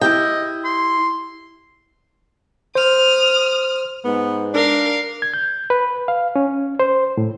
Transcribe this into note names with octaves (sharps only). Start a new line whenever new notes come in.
E4 G4 D#5 G5
C6
C5 D#6 F6
G#2 B3
D4 A#4 F5
G#6
G6
B4
F5
C#4
C5
A2